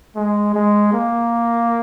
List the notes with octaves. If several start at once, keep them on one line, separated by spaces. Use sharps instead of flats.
G#3
G#3
A#3